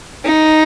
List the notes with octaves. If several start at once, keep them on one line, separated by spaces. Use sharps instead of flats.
D#4